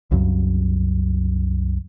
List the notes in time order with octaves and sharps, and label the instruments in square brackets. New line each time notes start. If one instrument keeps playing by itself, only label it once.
[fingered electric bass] C2 F#2 C#3 F#3